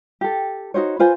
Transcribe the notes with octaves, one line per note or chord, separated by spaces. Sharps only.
G4 A4
D#4 F#4 C5 C#5
F4 B4 C5 G#5